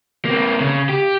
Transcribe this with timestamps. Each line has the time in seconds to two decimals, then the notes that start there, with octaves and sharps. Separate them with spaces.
0.25 A#3 C4
0.60 C#3
0.89 G4